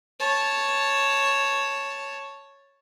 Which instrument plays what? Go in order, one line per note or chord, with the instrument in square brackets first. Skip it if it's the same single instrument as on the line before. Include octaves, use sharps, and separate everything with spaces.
[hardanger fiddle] C#5 A5